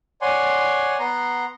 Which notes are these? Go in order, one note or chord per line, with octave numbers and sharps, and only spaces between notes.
C#5 D5 F#5 G#5 C6
B3 F#5 A#5 C6